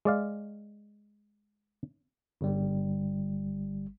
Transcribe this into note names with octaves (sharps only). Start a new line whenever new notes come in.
G#3 D5 F5
G1 G3